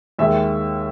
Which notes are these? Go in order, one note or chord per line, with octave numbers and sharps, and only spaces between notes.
D#2 D#3 G#3 E5